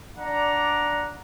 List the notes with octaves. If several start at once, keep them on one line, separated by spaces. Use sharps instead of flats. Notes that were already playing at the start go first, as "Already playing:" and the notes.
D4 D5 F#5 A#5